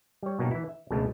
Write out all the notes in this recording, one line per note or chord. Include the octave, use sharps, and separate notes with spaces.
G3 C#5
B2 F#3 A#3 D4 D#4 G4
E3 E4
E5
C#2 B2 D3 F3 G#3 A3